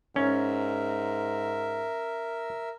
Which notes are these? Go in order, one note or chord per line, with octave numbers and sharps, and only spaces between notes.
G#2 C#4 A#4 E5